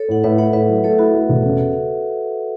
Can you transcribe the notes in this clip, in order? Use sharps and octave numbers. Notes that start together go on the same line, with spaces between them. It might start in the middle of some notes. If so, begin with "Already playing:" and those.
Already playing: A4 C#5
A2 F#5
A2 B4 E5
E4 C#5 F#5
A2 B4 E5
F#3
A3 A4 C#5
E4 F#4
A3
E1
C#3